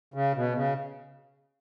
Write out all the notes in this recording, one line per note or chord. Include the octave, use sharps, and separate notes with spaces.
C#3
B2
C#3